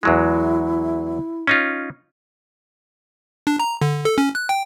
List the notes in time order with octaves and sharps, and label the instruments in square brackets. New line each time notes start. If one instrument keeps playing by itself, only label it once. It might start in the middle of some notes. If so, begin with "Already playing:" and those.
[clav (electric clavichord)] E2 F#3 G#3 [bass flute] E4
[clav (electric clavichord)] C#4 D#4 F4
[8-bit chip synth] D4
A#5
D3
A4
C#4
F#6
G5